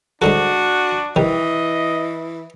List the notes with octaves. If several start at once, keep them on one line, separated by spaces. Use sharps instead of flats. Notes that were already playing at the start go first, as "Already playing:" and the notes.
G#2 D3 D4 F#4 A4
C3 D#3 E3 D#5